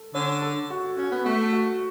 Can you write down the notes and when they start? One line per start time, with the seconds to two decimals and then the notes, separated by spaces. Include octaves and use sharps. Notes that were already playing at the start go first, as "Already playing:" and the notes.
Already playing: A4
0.14 D3 C#4
0.42 A4
0.70 F#4
0.97 C#4 F#4
1.11 B3
1.25 A3 F#4
1.53 F#4